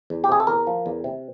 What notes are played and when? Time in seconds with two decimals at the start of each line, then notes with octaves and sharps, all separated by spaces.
0.10 E2
0.24 G4
0.29 C3 G#4
0.40 A4
0.47 E2 A#4
0.67 F3
0.86 E2
1.04 C3